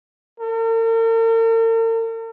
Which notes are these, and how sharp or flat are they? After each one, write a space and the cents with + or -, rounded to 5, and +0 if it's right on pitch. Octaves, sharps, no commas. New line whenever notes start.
A#4 -45